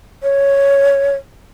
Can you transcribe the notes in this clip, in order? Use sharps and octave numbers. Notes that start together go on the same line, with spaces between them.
C#5